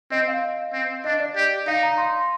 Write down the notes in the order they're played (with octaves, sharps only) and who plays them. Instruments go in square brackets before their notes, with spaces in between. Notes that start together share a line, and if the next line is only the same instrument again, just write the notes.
[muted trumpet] C4 [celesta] D#5
[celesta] F5
[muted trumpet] C4
[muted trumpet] D4 [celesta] D#5
[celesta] D5
[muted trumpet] G4
[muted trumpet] D#4 [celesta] F5
[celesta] A#5
C6